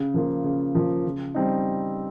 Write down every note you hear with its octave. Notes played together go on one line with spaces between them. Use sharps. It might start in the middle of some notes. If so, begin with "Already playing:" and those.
Already playing: C#3
F3 A#3 F4
C#3
F3 A#3 F4
C#3
G3 C4 D#4